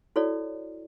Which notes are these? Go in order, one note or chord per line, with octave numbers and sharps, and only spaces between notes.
E4 F#4 A4 C#5 D5